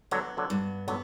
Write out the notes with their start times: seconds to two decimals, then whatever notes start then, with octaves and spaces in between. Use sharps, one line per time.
0.11 D3 F#3 B3
0.37 D3 F#3
0.50 G2
0.88 D3 F#3 B3